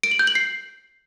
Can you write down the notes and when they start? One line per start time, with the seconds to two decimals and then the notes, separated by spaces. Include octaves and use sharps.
0.03 D7
0.11 F#7
0.19 G6
0.27 F#7
0.35 C7